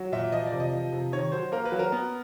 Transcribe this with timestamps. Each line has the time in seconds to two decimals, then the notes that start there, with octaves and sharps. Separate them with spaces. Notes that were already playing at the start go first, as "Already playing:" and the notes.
Already playing: F#3
0.12 A#2 E5
0.32 F3 D#5
0.46 D5
0.52 C3
0.60 D#5
0.73 F3
0.92 C3
1.12 D#3 C#5
1.32 F#3 C5
1.52 A#3 A#4
1.65 B4
1.72 F#3
1.79 A#4
1.92 B3